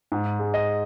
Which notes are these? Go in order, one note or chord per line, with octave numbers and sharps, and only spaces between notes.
G#2
G#3
D#5